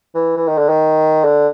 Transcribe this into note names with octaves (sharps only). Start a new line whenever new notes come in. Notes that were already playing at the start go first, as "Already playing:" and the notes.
E3
E3
D#3
D3
D#3
D3